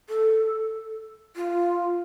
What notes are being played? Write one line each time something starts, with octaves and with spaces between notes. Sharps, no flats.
A4
F4